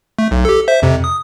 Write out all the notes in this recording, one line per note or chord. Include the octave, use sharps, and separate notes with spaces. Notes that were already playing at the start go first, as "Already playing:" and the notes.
A3
B1
G4 A4
C5 E5
F2 C3
D#6